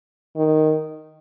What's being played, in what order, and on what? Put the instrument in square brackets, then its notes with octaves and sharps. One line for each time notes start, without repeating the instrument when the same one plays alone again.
[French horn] D#3